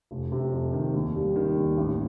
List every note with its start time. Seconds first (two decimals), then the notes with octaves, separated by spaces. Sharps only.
0.11 F1
0.32 C3
0.53 F2
0.73 D#3
0.94 D#2
1.15 G3
1.35 D#3
1.57 D#2
1.78 A1